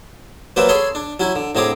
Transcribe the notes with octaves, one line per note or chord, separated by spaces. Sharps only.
F#3 A#3 B4 C5 D5 E5
G#4 A4 C#5 G#5 B5 C6
D4
F#3 C#4 E4
D3
A2 D3 C4 G#4 A#5 D6